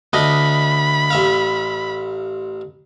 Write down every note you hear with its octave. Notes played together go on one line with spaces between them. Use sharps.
D2 D4 D#5 B5
A1 E5 F5